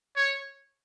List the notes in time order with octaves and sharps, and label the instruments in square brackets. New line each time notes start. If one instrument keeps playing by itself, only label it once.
[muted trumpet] C#5